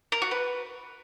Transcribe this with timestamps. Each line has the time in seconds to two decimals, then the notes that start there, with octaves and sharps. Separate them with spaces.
0.12 A#4
0.22 F#4
0.31 B4